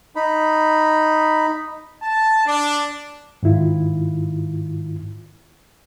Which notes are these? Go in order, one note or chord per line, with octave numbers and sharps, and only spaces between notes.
D#4 B5
A5
D4
G#2 D#3 E4 F4